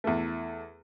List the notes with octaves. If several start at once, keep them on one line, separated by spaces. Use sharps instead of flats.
E2 A3